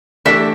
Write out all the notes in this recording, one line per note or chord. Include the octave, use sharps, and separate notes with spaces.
E3 A3 D4 G4 E5